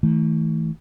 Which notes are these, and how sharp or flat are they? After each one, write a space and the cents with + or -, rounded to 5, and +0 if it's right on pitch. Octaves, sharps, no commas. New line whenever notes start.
E3 -45 A3 +0